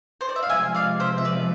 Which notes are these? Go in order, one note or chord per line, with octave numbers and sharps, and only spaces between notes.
C5
D5
E5
F5
C3 F3 G#3 E5 G#5
D5 F5
C5 E5
E5
B4 D5